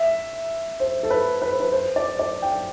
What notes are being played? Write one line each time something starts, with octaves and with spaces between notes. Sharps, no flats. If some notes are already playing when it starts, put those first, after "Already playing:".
Already playing: E5
C5
A4
B4
B4
C5
B4
C5
D5
D5
G5